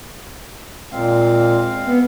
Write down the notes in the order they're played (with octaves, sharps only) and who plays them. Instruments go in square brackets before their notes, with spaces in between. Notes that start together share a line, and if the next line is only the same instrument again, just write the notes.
[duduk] A#2 [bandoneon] G#3 C4 F5
[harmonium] B3